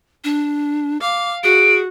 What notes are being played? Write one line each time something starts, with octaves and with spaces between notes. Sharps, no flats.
D4
F5 D6
F#4 G#4 D7